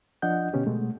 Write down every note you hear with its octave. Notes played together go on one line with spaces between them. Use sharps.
F3 D4 D#5 F#5 G6
B2 D3 B3 C#4 G4
B2 G#3 A3